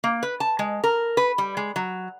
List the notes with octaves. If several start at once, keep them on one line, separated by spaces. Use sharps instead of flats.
A#3
B4
A5
G#3
A#4
B4
G3
G#3
F#3